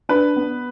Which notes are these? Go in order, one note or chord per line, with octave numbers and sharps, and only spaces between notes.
D4 B4
B3